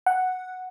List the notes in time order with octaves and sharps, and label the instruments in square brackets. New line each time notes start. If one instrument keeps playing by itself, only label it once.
[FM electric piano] F#5